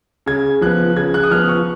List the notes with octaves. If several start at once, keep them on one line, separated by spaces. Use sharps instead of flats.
C#3 G#6
F3 B3 F#6
C#3 G#6
F#6
D#6
F3 B3 F6
C#6